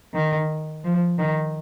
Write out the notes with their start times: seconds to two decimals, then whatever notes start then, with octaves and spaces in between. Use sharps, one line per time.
0.14 D#3
0.85 F3
1.19 D#3